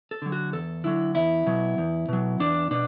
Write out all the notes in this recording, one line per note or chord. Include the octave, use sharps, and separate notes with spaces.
A4
D3 F#3
F#4
E2 A4
D3 F#3 E4
E2 E4
B2 F#3
E2
B2 F#3
E2 D4
B2 D4